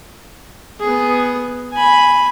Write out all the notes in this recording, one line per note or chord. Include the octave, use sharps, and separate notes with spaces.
B3 G#4
G#5 B5